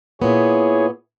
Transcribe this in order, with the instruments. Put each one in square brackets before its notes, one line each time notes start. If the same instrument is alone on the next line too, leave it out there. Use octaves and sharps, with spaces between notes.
[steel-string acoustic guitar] A#2 B3 [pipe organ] E4 G#4 C#5